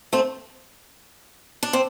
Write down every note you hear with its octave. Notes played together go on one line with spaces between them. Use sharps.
A3 C4
D4
C4